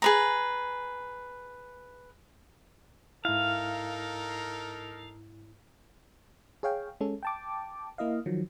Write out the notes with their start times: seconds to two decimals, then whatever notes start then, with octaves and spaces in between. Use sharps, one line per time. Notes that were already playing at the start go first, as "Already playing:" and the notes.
0.02 G#4 B4 A#5
3.25 G#2 D#4 E4 A4 A#4 F5
6.63 G#4 C#5 F5 G5
7.00 G#3 C#4 A4
7.23 G5 A5 D6
7.98 A#3 E4 D#5 F5
8.26 D#3 F3 F#3